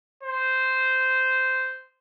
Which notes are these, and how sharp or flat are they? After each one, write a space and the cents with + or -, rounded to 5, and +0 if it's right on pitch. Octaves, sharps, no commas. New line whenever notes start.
C5 -10